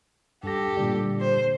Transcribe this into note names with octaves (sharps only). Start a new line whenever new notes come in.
G2 G4 A4 A#6
A#2 D3 G3
C5